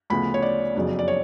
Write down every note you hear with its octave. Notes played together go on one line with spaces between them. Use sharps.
D2 C#3 F3 B3 B5
C#5
D5
F#1 F2 C#3 F#3 B3
D5
C#5